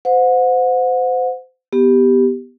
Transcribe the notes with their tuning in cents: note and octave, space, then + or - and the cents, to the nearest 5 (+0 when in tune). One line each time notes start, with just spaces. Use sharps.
C5 -30 F#5 -35
B3 +0 G4 +0